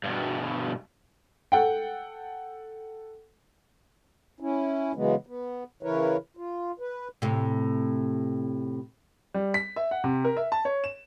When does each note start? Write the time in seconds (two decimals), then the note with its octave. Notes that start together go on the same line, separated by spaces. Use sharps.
0.04 G2 B2
1.52 A4 F#5 G5
4.40 C#4 E4
4.95 C#3 E3 F#3 G#3 B3
5.27 B3
5.83 C#3 E3 E4 A#4 B4 C#5
6.37 F4
6.80 B4
7.22 A2 C3
9.34 G3
9.54 B6
9.76 E5
9.91 F#5
10.04 C3
10.25 A#4
10.37 E5
10.52 A5
10.65 C#5
10.84 E7